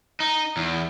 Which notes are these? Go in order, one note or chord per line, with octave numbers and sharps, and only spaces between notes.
D#4
E2